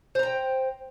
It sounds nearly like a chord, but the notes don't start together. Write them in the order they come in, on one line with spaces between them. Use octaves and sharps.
C5 A#5 G5